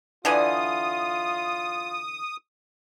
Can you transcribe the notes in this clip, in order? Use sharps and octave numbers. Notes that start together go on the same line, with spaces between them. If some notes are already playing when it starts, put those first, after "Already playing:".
D3 E3 F4 D5 D#5 G#5 D#6